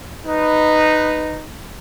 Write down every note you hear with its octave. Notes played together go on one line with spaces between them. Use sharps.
D#4 B4